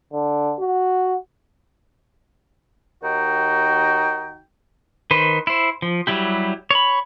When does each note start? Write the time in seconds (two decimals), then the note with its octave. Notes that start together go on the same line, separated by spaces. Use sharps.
0.13 D3
0.60 F#4
3.03 D#2 D#3 D#4 F#4 G5
5.11 D#3 B4 C5
5.47 E4 C5
5.82 F3
6.07 F#3 G3 E4 G4
6.71 C#5 B5